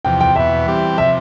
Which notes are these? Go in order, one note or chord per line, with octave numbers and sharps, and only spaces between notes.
E2 C3 F3 G5
G5
E2 B2 B3 E5
E3 G3 C4 G4
C3 F3 E5